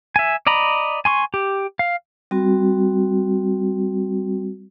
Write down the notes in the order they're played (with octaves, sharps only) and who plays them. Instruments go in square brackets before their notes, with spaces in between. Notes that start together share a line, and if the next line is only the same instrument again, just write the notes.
[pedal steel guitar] E5 G#5
D5 D#5 A#5 B5
G#5 C6 C#6
G4
F5
[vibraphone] G3 C4 F#4